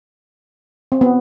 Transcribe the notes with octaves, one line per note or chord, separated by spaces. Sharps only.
C4
B3